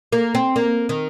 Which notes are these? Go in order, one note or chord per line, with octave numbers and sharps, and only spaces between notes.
A#3
C4
A#3
D#3